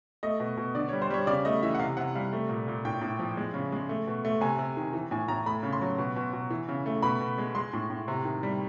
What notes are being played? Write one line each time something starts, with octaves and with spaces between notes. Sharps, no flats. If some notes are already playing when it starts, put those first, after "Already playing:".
A3 D#5
B2
B2
D3 D5
G3 C#5
C5
G3 C#5
C#3 D5
A3 D#5
E3 E5
F#5
C3 F5
C3 F#5
G3 F5
A3
A#2
A#2
A2 G5
A2
F3
G#3
C#3
G#3
A3
B2
A3
C3 G#5
C3
D#3
E3
A2 G#5
A2 A#5
A3 B5
C#3
C6
F#3
B2
B2
B2
E3
C#3
A3
B2 B5
B2
G#3
G#3 C6
A2
A2
C3
D#3
G3